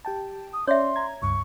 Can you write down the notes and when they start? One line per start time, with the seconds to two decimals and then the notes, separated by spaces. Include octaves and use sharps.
0.05 G4 G5 A5
0.53 D#6
0.67 C#4 C#5 D5 E5 C6
0.96 A#5 G#6
1.22 C#2 G2 C#6